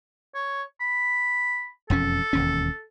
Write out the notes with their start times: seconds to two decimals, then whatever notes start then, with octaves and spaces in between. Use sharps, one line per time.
0.35 C#5
0.80 B5
1.90 E1 F2 C#4 A4
2.33 E1 D#2 C#4